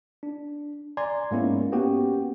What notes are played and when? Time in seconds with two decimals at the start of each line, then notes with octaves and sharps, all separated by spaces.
0.23 D4
0.97 D5 G#5 A#5 C6 G#6
1.31 G#2 G#3 A#3 B3 C#4 E4
1.72 A#3 B3 C#4 F#4 G4 G5